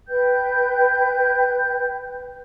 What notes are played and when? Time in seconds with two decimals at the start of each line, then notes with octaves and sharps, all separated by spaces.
0.08 B4 G5 G6